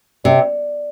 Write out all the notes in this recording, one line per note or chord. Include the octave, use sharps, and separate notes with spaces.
C3 D5